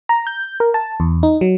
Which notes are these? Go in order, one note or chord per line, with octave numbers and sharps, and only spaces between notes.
A#5
G6
A#4
A5
E2
D#4
F#3